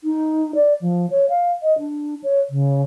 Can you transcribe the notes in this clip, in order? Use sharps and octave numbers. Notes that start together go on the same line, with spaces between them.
D#4
D5
F3
C#5
F5
D#5
D4
C#5
C#3